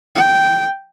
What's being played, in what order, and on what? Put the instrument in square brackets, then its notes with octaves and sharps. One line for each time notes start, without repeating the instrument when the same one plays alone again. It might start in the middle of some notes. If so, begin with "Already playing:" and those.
[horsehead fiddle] G5